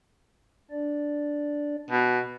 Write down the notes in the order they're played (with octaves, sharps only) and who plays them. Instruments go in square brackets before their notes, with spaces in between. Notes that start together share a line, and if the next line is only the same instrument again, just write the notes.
[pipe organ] D4 D5
[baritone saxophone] B2